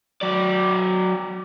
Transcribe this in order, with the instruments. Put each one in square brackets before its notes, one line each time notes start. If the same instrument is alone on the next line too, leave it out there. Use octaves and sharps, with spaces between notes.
[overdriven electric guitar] F#3 D5